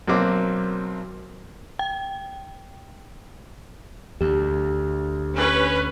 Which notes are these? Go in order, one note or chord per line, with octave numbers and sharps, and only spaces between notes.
B1 F#3 A#3 C4 D6
G5
D2 G4
C#4 B4